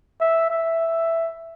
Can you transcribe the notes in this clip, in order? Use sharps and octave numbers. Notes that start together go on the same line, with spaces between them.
E5
E5